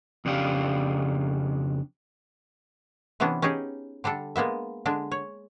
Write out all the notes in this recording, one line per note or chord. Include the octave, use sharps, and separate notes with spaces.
F2 C#3 D4 G4 F5
C3 E3 B3 C#4 D4
C#4 D#4 G4 G#4
D3 G3 D4 A4
G#3 A#3 B3 E5
D3 G#3 D4
C#5